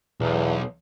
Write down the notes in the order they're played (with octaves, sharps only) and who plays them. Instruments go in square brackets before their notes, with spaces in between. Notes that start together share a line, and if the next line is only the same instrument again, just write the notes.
[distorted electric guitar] B1 [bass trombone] E2